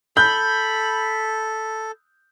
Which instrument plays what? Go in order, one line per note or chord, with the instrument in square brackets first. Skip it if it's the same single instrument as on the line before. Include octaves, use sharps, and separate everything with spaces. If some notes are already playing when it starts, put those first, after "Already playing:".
[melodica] A4 [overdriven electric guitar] B5 [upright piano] G6